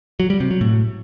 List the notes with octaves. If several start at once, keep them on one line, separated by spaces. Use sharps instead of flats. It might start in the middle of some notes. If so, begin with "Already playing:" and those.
F#3
G3
C3
F#3
A2